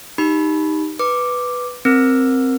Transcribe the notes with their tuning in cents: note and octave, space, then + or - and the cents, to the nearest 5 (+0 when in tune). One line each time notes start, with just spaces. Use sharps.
D#4 +0 G4 +0 B5 +0
B4 +0 D6 +0
C4 +0 A#4 +0 E6 +35